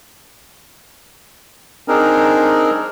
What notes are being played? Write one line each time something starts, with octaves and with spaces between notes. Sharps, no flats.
C4 D4 D#4 G#4 A#4